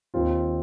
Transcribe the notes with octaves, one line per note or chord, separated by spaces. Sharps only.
D#2 D#3 C4 F4